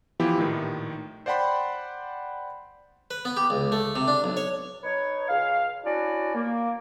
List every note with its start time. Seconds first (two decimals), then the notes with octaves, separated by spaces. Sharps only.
0.20 E3 F3 B3 E4 G4
0.37 A#1 A2 D#3
1.26 C5 D5 F#5 G5 B5 C6
3.11 B4
3.25 B3
3.37 G4
3.50 C#2
3.72 A3
3.96 C3
4.08 D4
4.24 B1
4.37 C#5
4.83 D#4 B4 C#5
5.28 C#2 F5
5.83 C#4 D4 E4 F#4 D5
6.34 A#3